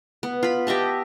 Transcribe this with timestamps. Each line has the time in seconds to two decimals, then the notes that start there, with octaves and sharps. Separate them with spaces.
0.23 B3
0.43 F4 B5
0.67 G4 D#5 E5 A5